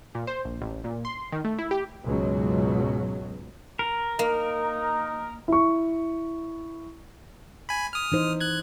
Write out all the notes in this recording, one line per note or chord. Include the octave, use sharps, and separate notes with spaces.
A#2
C5
A#1
A1
A#2
C6
D#3
A3
E4
G4
C#2 G#2 B2 F#3
A#4
A#3 D#4
E4 C#6
G#5 B5
D#6 F6
E3 D#4 C5
F#6 G#6